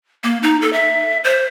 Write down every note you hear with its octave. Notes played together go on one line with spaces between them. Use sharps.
A#3
D#4
A4
E5
C5